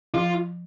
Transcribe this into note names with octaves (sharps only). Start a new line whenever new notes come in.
F3 F4